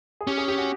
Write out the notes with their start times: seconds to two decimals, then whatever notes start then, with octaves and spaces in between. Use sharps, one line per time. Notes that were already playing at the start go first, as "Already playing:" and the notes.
0.21 G#4
0.27 C#4 G4
0.38 G#4
0.48 G4
0.58 F#4